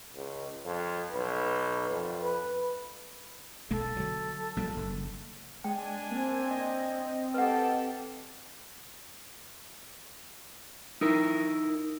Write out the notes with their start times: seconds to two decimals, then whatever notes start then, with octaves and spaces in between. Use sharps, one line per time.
0.15 C#2
0.65 F2
1.12 B1 B4
1.91 F2
2.22 B4
3.71 B1 G#3 A#3 A4
3.97 D3 F#3
4.56 A#1 G3 A#3
4.77 F#1
5.64 G#3 D4 G5 G#5
6.11 A#3 C4
6.50 D#5
7.34 G4 A4 B4 F#5
11.01 D#4 E4 A#4